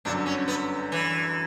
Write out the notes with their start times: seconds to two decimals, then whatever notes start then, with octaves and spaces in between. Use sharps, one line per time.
0.05 G1 F#2 D3 D4
0.26 C#4
0.48 B3
0.92 E3